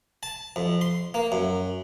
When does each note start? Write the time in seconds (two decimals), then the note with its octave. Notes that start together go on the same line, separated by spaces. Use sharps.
0.23 A5
0.56 F2
0.81 C6
1.14 A#3
1.32 F#2